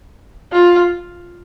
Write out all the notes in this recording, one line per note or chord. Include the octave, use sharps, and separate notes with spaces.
F4